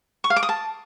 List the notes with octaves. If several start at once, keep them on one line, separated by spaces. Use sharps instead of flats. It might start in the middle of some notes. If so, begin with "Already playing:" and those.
C#6
F5
D6
D#6
A5